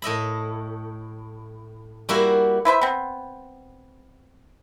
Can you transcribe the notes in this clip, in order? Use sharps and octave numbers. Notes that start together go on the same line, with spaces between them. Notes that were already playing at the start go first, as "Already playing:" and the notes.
A2 D#5 E5 B5
G3 A#3 E4 F#4 E5 F#5
E4 B4 C5 E5
B3 C4